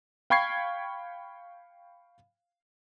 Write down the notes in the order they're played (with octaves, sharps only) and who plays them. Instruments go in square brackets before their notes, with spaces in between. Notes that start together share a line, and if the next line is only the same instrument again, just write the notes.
[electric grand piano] F5 G5 B5 C#6 G#6 C7